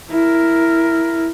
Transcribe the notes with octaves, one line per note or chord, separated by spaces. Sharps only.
E4 A#4